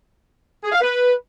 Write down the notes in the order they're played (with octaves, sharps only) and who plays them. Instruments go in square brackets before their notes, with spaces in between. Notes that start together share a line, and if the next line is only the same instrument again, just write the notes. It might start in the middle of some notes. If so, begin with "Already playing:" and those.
[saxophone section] G#4
F5
B4